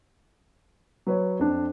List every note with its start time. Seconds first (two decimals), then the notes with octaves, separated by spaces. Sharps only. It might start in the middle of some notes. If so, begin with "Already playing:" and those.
1.07 F#3 B4 C#5
1.39 F2 D4